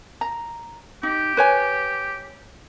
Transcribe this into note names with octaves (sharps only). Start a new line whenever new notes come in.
A#5
D#4 G4
B4 C#5 G#5